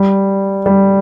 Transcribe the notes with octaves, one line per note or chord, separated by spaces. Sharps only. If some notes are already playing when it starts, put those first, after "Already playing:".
Already playing: G3
G3